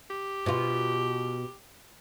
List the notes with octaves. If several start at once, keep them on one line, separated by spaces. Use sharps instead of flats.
G4
B2 F4